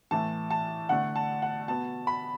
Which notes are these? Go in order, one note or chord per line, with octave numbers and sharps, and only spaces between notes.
A2 E3 A3 A5
A5
D3 A3 F#5
A5
F#5
B2 B3 A5
B5